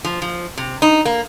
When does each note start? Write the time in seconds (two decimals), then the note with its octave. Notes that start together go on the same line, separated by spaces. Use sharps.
0.04 F3
0.22 F3
0.58 C3
0.82 D#4
1.05 A#3